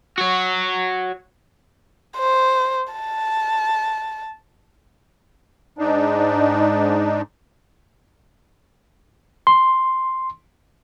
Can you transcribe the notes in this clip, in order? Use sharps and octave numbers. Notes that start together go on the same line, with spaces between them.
F#4 C#5
C5
A5
G#2 D4 D#4
C6